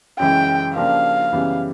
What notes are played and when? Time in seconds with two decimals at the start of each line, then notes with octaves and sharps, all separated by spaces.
0.19 F#2 C#3 E3 G#3 C#4 G5
0.75 C#3 F3 A#3 D4 G4 F5
1.33 F#2 C#3 E3 G3 B3